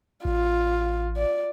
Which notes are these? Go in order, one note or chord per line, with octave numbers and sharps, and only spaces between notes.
A1 F4
D5